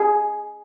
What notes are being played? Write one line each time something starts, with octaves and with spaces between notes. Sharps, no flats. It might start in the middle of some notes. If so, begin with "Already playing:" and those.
Already playing: G#4